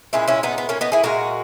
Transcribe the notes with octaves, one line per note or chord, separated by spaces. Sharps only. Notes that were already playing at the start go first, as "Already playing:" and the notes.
A#2 G#3 C#4 E4
C#4 E4
B3 D#4
B3
A#3 C#4
B3 D#4
E4 G#4
A#2 G#3 F#4 A#4